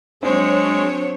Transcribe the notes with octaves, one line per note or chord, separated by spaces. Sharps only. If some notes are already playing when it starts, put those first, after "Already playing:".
F#3 G#3 C4 D4 C5 C#5